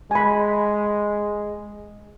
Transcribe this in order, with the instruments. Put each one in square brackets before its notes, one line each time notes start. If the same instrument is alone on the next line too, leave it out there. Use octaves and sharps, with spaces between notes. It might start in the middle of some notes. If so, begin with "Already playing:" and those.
[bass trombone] G#3 [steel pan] G#5 B5